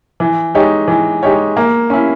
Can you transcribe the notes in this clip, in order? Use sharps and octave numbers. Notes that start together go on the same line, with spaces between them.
E3
G#3 D#4 G4 C#5
E3
G#3 D#4 G4 C#5
A#3
C#4 E4